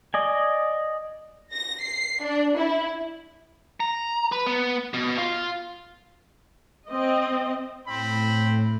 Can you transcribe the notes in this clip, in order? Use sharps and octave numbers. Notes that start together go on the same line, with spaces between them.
D5 D#5 G#5
A#6
C7
D4
E4
A#5
B4
B3
B2
F4
C4 D#5
A2 C4 B5